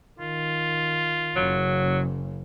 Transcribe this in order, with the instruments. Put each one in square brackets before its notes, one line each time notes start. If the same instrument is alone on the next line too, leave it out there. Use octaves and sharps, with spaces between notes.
[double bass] D#3 [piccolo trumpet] F4
[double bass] F#1 C#3 [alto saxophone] F#3